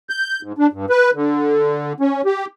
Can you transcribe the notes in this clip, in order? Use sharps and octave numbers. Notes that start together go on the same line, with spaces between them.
G6
G#2
D4
G2
B4
D3
C#4
G4